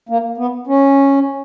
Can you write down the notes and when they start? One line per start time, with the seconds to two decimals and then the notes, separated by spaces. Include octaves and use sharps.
0.09 A#3
0.38 B3
0.67 C#4